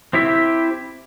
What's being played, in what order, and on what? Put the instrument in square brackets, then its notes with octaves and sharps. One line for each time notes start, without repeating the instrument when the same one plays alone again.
[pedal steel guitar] C4 E4 G4 E5